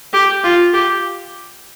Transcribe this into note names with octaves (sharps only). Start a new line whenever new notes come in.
G4
F4
G4